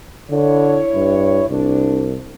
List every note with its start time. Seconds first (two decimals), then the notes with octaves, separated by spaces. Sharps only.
0.31 D3 E4 C#5
0.94 G2
1.49 C2 D4